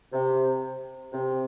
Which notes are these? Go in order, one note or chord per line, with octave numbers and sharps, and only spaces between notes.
C3
C3